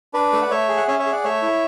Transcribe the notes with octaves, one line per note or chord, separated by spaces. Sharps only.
D4 B4 D5
A3
F#5
A3 C#5 E5
G#4
F#5
C#4 C#5 E5
C#5 E5
G#4
D5 F#5
A3 C#5 E5
E4